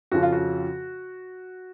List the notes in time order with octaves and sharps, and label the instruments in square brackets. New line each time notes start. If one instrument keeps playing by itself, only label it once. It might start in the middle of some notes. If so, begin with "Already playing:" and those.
[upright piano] F2 C#3 F3 F#4
F4
F#4